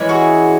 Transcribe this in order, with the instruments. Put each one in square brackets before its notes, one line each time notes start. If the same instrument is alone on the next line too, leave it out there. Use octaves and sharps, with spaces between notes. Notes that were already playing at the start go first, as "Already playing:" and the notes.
Already playing: [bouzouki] E3 G#3 C#4 E4
F#4 G#4